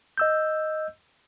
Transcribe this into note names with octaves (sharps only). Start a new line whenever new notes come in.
D#5 E6 G6